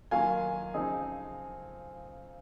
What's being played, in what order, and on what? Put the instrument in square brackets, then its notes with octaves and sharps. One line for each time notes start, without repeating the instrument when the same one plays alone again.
[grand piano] D#3 F#3 A#3 F4 [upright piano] F5 G#5
[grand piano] C#3 F3 C4 D#4 G#4